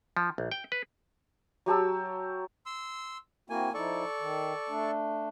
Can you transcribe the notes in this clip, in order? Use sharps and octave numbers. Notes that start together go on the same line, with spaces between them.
F3
A#1
G5
B4
F#3 G4 A5 E6
C6 E6
A#3 C4 E4 F#4 G#5
F3 D#4 E4 A4 D5 C#6
D#3
A3 D4